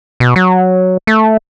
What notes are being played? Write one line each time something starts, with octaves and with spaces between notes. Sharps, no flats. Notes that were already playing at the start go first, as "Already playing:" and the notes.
B2
F#3
A3